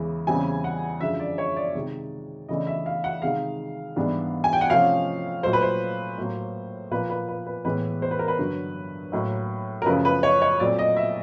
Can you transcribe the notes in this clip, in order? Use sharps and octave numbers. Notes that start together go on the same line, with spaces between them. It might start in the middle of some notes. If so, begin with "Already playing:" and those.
Already playing: E2 C#3 E3 G#3
E2 C#3 E3 G3 C4 G#5
F#5
F#2 D3 F3 G#3 E5
D5
C#5
D5
C3 D#3 G#3
C#3 E3 A3 D4 D#5
E5
F5
F#5
C3 D#3 G#3 F5
G#2 E3 G3 B3 D4
G#5
G5
F#5
C3 F3 A3 C#4 F5
A#2 F#3 A3 C5
B4
C5
A2 F#3 A#3
A#2 F3 A#3 B4
B4
B4
B4
A2 E3 G#3 B3 B4
C5
B4
A#4
B4
G2 D3 F#3
A2 F#3 A#3
A#4
F#2 C#3 F3 A3 B4
B4
C#5
C#5
A#2 F#3 A3 C4 D5
D#5
E5